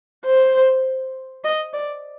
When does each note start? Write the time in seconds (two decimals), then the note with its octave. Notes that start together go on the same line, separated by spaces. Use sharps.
0.25 C5
1.44 D#5
1.73 D5